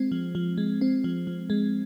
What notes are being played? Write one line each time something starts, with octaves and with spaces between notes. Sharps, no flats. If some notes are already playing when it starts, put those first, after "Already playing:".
Already playing: G#3 C4
F3
F3
G#3
C4
F3
F3
G#3